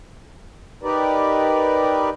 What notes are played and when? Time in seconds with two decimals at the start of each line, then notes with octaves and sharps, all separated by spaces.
0.83 D#4 G4 A#4 B4 D5